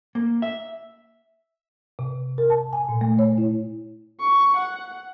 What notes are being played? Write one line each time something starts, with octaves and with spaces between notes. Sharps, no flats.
A#3
E5
C3
A#4
A5
G#5
A#2
A3
C#5
E4
C#6
F#5